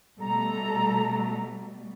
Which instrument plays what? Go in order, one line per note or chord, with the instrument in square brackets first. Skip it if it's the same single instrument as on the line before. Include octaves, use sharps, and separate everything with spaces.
[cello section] B2 G3 A3 [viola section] A4 A#5